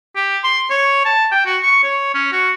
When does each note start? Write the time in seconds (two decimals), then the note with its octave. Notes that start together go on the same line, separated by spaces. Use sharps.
0.16 G4
0.44 C6
0.70 C#5
1.05 A5
1.31 G5
1.46 F#4
1.63 C#6
1.84 C#5
2.15 C#4
2.32 F#4